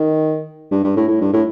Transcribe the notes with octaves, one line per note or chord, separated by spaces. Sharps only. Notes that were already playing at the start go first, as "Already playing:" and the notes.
Already playing: D#3
G2
G2
A2
A2
G2
A2